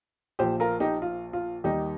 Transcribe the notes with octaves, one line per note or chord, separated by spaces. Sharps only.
A#1 A#2 F3 G4 C5
F4 A#4
D#4 G4
F4
F4
D#2 D#3 G3 D#4 G4